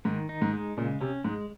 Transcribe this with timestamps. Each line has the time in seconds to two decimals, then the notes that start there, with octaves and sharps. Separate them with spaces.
0.05 G#2 D#3
0.29 D#4
0.42 G#2
0.53 G#3
0.77 A#2 C#3
1.01 C3 C#4
1.24 G#2 G#3